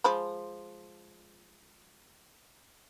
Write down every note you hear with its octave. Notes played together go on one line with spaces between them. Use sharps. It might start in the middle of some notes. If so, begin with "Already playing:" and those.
F3 G#3 B5